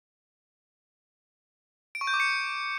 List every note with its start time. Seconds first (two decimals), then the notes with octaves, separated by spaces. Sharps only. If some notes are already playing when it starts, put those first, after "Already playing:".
1.95 D7
2.01 C#6
2.07 G6
2.14 D6
2.20 C#7